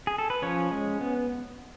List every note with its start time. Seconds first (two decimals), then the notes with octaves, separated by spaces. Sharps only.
0.07 G#4
0.18 A4
0.30 B4
0.42 F3 C#4 C#5
0.71 G#3
1.01 B3